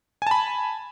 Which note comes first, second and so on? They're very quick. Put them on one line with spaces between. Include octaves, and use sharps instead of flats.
G#5 A5 B5